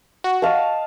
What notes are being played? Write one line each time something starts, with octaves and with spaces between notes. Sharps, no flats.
F#4
D#5 F5 A5